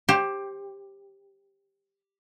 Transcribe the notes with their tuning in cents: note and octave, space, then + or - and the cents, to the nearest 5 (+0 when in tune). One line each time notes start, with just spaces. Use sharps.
G4 +5 C5 +25